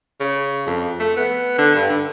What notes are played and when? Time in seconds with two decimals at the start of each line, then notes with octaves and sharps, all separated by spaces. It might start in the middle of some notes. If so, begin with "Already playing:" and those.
0.20 C#3
0.67 F2
1.00 A3
1.16 B3
1.58 D3
1.75 G2
1.90 D3